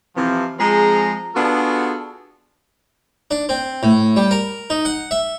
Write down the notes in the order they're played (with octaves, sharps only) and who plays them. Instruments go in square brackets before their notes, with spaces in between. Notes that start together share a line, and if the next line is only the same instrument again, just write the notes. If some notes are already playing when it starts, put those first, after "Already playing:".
[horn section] C3 E3 F3
F3 G#3 C4 G#4 A#5
B3 D4 F4 F#4 G#4 A4
[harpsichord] D4
C4
A2
G3
A#4
D#4
F#5
E5